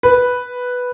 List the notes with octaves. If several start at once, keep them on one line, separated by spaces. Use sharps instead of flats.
B4